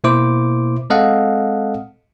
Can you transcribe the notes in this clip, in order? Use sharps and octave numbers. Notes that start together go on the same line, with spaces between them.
B2 A#3 E4 C5 D6
G#3 C4 A4 D#5 F5 F#5